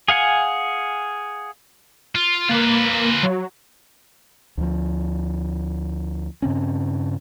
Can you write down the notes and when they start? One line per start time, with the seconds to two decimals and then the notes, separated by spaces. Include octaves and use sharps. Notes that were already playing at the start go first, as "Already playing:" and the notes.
0.08 G#4 F5 F#5 G#5
2.15 F4
2.49 A#3 F4 B4
3.23 F#3
4.58 D2 F3
6.42 G2 C#3 C4 C#4